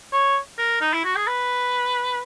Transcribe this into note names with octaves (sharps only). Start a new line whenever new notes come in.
C#5
A#4
D#4
E4
F#4
G#4
B4